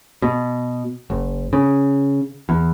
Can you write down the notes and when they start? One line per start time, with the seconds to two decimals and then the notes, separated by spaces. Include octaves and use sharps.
0.22 B2
1.10 F#1
1.53 C#3
2.49 E2